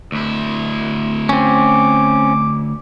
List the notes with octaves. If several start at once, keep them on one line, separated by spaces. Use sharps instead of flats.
D2 E4
C4 C#4 D6